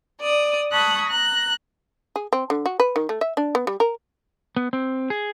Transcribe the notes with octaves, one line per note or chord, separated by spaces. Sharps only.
D5 D#6
A5 B5 C#6 D#6 F#6 G#6
A#5 F#6
G#4
C4
D3
F#4
B4
D#3
A3
E5
D4
B3
G3
A#4
B3
C4
G#4